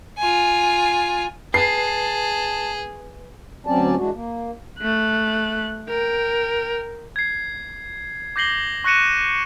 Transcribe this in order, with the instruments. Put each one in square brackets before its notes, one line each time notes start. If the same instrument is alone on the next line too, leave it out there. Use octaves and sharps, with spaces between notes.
[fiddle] F4 G#5
[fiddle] G#4 [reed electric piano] B4 [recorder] A5 [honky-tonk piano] C7
[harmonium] D2 F#3 C4 C#4 D5 A5
E3 G#3 D4 F#4
A#3
[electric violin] A3 F#6
A#4 G5
[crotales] G#6 C7
D6 G6 A#6 C7 F#7 G7
C#6 F#6 A#6 C#7 D#7 E7